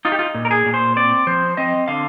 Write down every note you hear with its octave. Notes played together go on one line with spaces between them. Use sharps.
D#4 F4
G4
F4
A#2
A#4
G#4
A#2
C5
C4 D5
F3 C5
C4 D#5
D3 F5